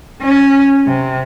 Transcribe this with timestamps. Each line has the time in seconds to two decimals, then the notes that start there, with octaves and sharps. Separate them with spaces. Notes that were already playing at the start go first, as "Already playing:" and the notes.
0.22 C#4
0.88 C3